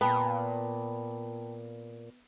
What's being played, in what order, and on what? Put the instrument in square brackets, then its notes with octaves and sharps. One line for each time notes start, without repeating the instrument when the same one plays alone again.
[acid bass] A#2 [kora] B3 [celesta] G5 A5 B5